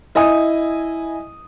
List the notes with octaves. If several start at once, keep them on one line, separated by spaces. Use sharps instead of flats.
E4 D#5 G#5 D#6